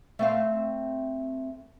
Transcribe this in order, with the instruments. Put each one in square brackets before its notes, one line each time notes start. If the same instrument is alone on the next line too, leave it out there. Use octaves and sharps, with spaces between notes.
[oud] A3 C4 F5